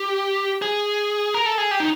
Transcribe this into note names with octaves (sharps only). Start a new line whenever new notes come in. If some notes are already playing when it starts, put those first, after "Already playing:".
Already playing: G4
G#4
A#4
A4
G#4
G4
D#4